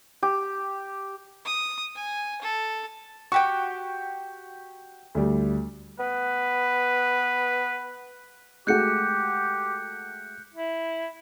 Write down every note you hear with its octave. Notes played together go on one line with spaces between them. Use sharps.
G4
D#6
G#5
A4
F#4 G4 G5 C#6
D2 G3
B3 B4
G#3 A3 F#4 G4 F#6 G6 C#7
E4